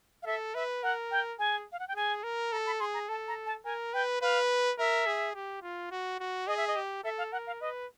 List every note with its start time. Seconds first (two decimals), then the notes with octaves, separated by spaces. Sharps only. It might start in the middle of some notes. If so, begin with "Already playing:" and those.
0.23 F5
0.26 A4 E5
0.55 B4 E5
0.83 A#4 F#5
1.11 G5
1.39 G#4 G#5
1.72 F5
1.79 F#5
1.88 G5
1.95 G#4 G#5
2.24 A#4
2.52 A4 A#5
2.66 B5
2.80 G#4 C6
2.94 A#5
3.09 A4 A5
3.28 A#5
3.46 A5
3.65 A#4 G#5
3.93 B4 G5
4.22 B4 F5
4.79 A#4 E5
5.06 G#4
5.35 G4
5.62 F4
5.91 F#4
6.20 F#4
6.47 G#4 D#5
6.57 E5
6.68 D#5
6.76 G4
7.04 A4 E5
7.18 F5
7.32 A#4 F#5
7.47 F5
7.61 B4 D#5